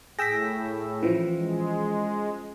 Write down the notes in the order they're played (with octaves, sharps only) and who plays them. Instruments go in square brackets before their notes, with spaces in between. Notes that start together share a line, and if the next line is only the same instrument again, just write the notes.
[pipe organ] A2 [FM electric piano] G#4 G5 E6 [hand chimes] A#6 B6
[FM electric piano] E3 F3 [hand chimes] C#4 F4 C5
[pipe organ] G#3